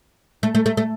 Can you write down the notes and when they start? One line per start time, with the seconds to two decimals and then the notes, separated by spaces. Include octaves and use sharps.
0.43 A3
0.55 A3
0.66 A3
0.77 A3